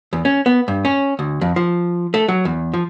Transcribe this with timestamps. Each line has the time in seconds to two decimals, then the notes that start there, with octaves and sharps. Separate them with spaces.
0.13 E2
0.25 C#4
0.46 B3
0.68 G2
0.85 C#4
1.19 D2
1.41 F2
1.56 F3
2.14 A3
2.29 F#3
2.45 E2
2.74 F3